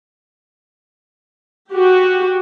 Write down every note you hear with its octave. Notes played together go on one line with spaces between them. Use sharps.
F#4 G4